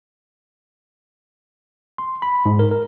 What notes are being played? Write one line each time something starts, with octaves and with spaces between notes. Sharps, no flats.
C6
B5
G#2
A#4
A#4